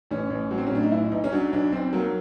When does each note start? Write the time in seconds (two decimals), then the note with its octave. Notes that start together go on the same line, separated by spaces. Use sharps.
0.11 A1 C#4
0.30 A1
0.51 F#3
0.58 C4
0.67 C#4
0.71 A2 D4
0.83 D#4
0.92 B1 E4
1.12 B1 D#4
1.24 C#4
1.32 F#3 D4
1.53 B1 D4
1.72 B1 C4
1.93 F#3 A#3